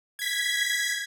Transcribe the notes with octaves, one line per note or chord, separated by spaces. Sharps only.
G#6 B6